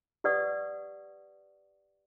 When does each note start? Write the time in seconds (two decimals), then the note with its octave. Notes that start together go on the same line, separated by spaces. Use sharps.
0.24 G4 B4 D5 F#5 C#6 D#6